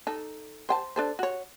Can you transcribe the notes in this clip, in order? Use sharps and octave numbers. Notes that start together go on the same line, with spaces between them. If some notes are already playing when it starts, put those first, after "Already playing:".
D#4 A4
C5 G5 A5
D4 A4 C5
F#4 C#5